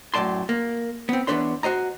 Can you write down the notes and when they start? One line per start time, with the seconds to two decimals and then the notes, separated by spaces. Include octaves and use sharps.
0.14 F#2 A2 D5 A5 C6
0.49 A#3
1.09 B3 C4
1.27 E2 E3 D4 B4 C#5 C6
1.63 F#4 C5 D#5 A#5